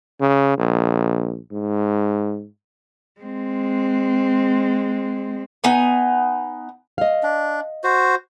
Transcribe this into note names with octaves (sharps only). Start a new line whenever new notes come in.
C#3
A#1
G#2
G#3 C4
B3 D#4 G#5
D#5 F5
D4
F#4 C5